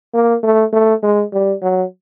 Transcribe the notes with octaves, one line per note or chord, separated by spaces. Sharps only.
A#3
A3
A3
G#3
G3
F#3